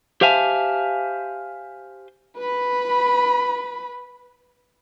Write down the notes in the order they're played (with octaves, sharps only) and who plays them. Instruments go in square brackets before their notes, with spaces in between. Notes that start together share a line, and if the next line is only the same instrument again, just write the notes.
[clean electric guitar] G4 C5 E5 F5 G#5 A5
[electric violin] B4 B5